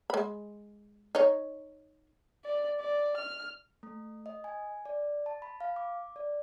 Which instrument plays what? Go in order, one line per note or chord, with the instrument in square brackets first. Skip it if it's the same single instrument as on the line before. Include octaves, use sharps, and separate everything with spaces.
[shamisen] G#3 B5
D#4 C#5
[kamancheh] D5
D5
F6
[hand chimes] A3
D#5
G#5
D5
A5
B5
F5
D6
D5